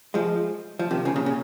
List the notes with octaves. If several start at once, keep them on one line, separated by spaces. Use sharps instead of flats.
F3 G#3
F3
C3 D#3
C#3 F3
A#2 C#3
A#2 C#3